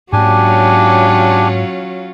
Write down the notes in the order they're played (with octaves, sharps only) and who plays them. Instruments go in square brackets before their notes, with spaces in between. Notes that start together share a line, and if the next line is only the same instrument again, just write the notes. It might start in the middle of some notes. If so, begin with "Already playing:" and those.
[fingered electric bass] G#2 A#3 [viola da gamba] F#3 C#4 F4 [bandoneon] D4 G4 G#5